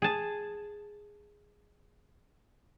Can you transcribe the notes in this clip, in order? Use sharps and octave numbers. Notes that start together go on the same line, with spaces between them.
G#4 A5